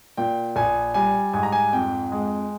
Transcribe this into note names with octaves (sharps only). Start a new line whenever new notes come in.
A#2 G5
A#1 G#5
G3 G#5
G#2 G#5
A#5
G#5
F2 G5
G#3